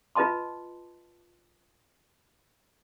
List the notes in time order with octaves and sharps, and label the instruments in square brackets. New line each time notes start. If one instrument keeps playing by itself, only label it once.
[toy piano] F4 B4 D#5 A5 C6